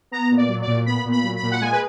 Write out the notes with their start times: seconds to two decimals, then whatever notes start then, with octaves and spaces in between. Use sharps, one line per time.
0.11 B3 A#5
0.31 A#2
0.37 D5
0.49 F#3
0.62 D5
0.67 A#2
0.86 B3 B5
1.05 A#2
1.12 B5
1.24 F#3
1.37 B5
1.43 A#2
1.52 F#5
1.61 G#3 G#5
1.73 B4